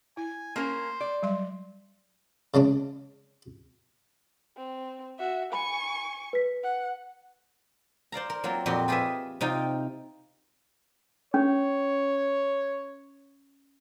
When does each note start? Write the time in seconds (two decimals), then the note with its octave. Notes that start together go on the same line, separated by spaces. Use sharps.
0.17 E4 G#5
0.56 A#3 C#4 A#4 C5
1.01 D5
1.23 F#3 G3 C6
2.54 C#3 G#3 C#4 D4
4.57 C4
5.19 F#4 E5
5.53 G#5 B5 C#6
6.33 B4 B6
6.63 F#5
8.12 C5 D5 F5 A#5
8.30 A#4
8.44 F#3 A#3 C4 F4
8.66 F2 A#2 C4 F#4 G4 C6
8.88 F4 G4 G#4 B4 D#5 E5
9.41 C3 D#4 F4 G5
11.34 C#4 C#5